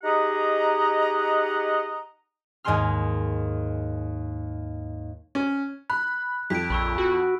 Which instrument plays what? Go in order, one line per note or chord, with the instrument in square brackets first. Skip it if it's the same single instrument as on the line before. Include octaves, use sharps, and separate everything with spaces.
[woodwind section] D#4 G4 G#4 D#5 F#5 A#5
[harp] D#2 G#2 G#3 G#4 C6 F6
[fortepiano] C#4
[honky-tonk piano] B5 [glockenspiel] F#6
[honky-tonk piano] F2 [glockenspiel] B6 D7
[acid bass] A#1 [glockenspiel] B5 C#6 E6
[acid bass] F#4